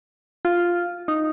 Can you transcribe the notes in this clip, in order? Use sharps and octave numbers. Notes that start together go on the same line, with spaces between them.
F4
D#4